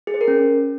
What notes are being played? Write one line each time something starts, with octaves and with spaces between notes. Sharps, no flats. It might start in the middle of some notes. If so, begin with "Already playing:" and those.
G#4
C5
A#4
C#4